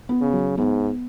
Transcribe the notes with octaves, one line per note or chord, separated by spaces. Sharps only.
B3
C#3
F#3
G#2 B3